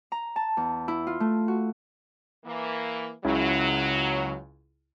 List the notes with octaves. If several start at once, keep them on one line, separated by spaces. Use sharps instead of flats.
A#5
A5
E2
E4
F4
A3
F#4
E3 A#3
C#2 C#3 F#3 E4